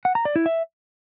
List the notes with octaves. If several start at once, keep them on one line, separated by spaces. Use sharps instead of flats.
F#5
A#5
D5
E4
E5